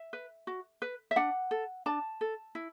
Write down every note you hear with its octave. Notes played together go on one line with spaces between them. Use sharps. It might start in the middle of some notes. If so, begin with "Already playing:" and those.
Already playing: E5
B4
F#4
B4
E5
D4 F#5
A4
D4 A5
A4
E4